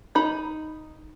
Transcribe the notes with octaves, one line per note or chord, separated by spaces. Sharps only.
D#4 A#5 B5